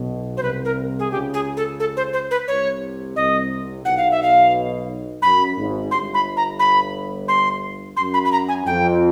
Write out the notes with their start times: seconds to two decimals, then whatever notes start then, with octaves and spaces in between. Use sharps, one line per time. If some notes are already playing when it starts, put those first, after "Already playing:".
Already playing: B1 B2
0.37 C5
0.42 C2 C3 B4
0.65 A#4
0.99 G#4
1.11 C#2 C#3 G4
1.34 G#4
1.57 A4
1.80 A4
1.97 C5
2.13 C5
2.31 B4
2.48 C2 C3 C#5
3.16 C2 C3 D#5
3.85 B1 B2 F#5
3.97 F5
4.11 E5
4.23 F5
5.22 F#2 B5
5.57 G#1 G#2
5.91 G1 G2 C6
6.14 B5
6.37 A#5
6.59 B5
7.28 C6
7.97 F#2 C6
8.14 B5
8.25 B5
8.32 A#5
8.48 G#5
8.66 F2 G5